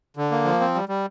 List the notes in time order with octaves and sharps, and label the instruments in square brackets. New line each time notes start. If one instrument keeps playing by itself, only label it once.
[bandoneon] D3
A#3
F3
C4
G3
G3